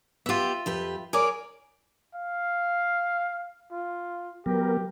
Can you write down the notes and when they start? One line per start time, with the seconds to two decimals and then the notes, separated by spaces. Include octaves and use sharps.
0.26 B3 F4 G4 E5
0.66 F2 G4 B4
1.13 G#4 A#4 C#5 D5 D6
2.14 F5
3.72 F4
4.46 F#3 B3 G4 A#4